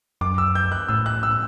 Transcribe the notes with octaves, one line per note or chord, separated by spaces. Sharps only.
F#2 D6
E6
G6
F#6
A2 E6
F#6
E6